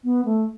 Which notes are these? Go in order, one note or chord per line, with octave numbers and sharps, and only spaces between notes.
B3
A3